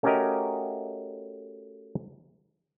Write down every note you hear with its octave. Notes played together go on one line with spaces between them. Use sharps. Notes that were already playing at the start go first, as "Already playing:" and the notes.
A3 C#4 F#4 G4 A#4 D#5